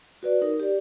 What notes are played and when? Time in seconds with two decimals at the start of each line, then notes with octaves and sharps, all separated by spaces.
0.23 F#4 B4 D5
0.42 D#4 A#4
0.60 G4 D5